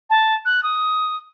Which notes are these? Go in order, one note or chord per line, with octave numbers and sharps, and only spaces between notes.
A5
F#6
D#6